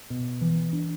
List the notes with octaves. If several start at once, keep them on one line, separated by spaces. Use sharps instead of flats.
B2
E3
D4